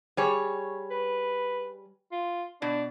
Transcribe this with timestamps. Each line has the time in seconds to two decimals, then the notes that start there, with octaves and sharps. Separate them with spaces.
0.17 G3 G#4 C#5
0.91 B4
2.12 F4
2.62 B2 D4